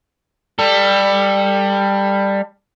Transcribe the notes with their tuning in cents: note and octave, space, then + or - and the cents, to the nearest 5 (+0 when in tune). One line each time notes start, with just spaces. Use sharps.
G3 +15 A4 +25